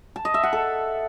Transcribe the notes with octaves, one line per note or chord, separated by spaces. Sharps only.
A5
D#5
E5
F#5
A4